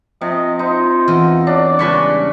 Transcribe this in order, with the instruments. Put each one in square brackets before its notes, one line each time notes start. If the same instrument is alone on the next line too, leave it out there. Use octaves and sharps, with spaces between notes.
[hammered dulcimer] C3 [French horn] F3 [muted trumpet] D#5
[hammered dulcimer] D#4 [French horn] F4 [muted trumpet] C5
[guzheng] E2
[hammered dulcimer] D4 [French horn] C#5 [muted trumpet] D5
[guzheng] C#3 G#3 D4 [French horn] G3 [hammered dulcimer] B4 B5 C#6